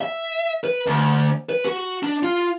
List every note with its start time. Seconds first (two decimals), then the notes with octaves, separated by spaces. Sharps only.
0.01 E5
0.64 B4
0.87 D2
1.49 B4
1.65 F#4
2.03 D4
2.23 F4